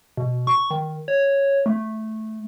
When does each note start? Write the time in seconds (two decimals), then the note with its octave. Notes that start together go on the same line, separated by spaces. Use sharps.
0.17 B2
0.47 C#6
0.71 D#3
1.08 C#5
1.66 A3